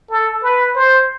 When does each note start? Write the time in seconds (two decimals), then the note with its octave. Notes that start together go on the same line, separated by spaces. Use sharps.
0.10 A4
0.43 B4
0.76 C5